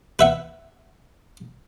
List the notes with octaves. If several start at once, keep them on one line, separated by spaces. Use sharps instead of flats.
B4 E5 F#5